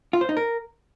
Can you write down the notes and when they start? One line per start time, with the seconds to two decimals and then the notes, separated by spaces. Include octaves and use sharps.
0.13 F4
0.21 C5
0.29 D#4
0.37 A#4